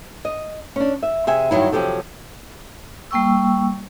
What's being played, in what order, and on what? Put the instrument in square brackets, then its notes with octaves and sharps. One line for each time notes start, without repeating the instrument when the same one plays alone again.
[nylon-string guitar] D#5
C#4 D4
E5
C3 G#4 E5 G#5
G2 C3 D#3 F#3 E4
C3 F3 F#3 G4 A4
[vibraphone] G3 A#3 G5 C#6 E6